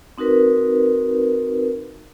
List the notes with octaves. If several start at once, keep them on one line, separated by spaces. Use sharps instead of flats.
C4 D#4 F#4 A#4 B4